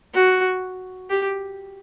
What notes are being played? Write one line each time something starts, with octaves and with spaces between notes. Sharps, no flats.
F#4
G4